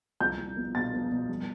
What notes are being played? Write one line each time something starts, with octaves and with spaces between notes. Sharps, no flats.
C2 G6
C2
B3
B2 A6
B3
B2
G3